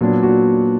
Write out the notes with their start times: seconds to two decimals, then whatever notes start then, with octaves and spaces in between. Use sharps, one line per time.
0.01 A#2 F#3 B3 D4
0.23 F#4